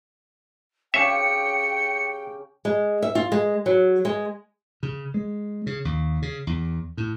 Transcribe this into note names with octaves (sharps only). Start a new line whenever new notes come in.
C#3 C#4 G4 E5 G5 C#7
G#3
E5
F4
G#3
F#3
G#3
C#3
G#3
C#3
D#2
C#3
E2
A2